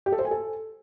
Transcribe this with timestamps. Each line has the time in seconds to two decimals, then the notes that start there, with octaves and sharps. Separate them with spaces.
0.06 G4
0.12 A4
0.19 C5
0.25 G#5
0.31 A4